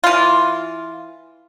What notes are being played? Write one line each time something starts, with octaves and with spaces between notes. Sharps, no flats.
E3 F4